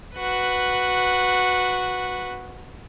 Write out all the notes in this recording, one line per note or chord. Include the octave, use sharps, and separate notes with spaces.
F#4 B4